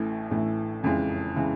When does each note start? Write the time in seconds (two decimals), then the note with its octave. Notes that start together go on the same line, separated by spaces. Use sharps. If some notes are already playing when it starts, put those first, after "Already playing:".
Already playing: A1 A2 E3 A3
0.31 A1 A2 E3 A3
0.83 F#1 F2 C#3 E3 G#3
1.36 C#3 E3 G#3